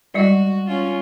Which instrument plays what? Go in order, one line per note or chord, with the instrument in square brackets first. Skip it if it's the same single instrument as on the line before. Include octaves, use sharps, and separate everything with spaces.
[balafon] G3 G#3 D#5 [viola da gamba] F#4
[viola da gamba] C#4 F4